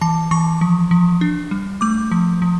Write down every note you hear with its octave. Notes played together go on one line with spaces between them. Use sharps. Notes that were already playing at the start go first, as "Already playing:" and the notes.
E3 A5
E3 C#6
F3
F3
D4
G3
A3 D6
F3
F3